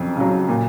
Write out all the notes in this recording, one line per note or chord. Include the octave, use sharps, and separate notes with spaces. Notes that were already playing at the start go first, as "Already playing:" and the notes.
Already playing: F2 C#3 F#3
C#3 F#3
A#2